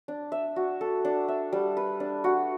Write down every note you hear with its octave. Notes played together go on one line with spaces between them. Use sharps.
D4
E5
F#4
A4
D4
E5
G3
B4
D4
F#4